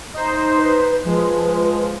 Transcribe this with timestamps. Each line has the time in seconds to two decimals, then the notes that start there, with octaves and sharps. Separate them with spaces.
0.14 D#4 C5
0.57 B4
1.05 F3 G#3 B4